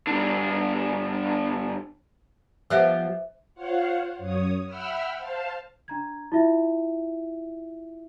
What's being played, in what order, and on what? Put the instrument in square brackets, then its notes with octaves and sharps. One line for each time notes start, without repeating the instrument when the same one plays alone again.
[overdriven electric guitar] G2 D3
[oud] F3 B3 G4 [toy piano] B4 C5 E5
[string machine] F4 C5 C#5 F5 F#5
F#2 C#5 D#6
E5 F#5 G5 B5 E6 F6
C5 F5 A5
[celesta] D4 A#5 G#6
E4 F4 E5